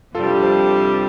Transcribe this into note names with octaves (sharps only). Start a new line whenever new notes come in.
F2 C3 G3 D4 F4 G4 A4
A4 C5